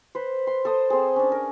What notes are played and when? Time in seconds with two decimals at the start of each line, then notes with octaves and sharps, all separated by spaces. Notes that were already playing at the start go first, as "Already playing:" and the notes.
0.15 B4 C5
0.47 C6
0.65 A4 C5 D#6
0.90 C4 G#4
1.16 C#4 D4
1.32 A#4